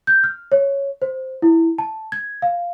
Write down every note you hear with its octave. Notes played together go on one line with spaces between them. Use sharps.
G6
F6
C#5
C5
E4
A5
G#6
F5